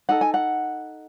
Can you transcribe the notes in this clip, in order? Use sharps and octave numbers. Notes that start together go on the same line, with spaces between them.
D#4 A4 F#5
G#5
F#5